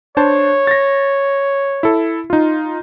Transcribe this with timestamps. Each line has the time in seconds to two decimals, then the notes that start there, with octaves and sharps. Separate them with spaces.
0.17 D4 C5 C#5 A5
0.67 A6 A#6
1.83 E4 A4
2.30 D#4 F4